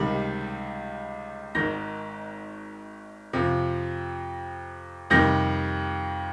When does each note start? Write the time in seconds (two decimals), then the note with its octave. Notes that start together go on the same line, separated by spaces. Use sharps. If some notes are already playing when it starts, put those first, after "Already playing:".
Already playing: C#2 C3 D#3 G3
1.55 G#1 G#2 D#3 G6 A#6
3.33 F2 C3 F3
5.10 F2 C3 D#3 G3 G6 A#6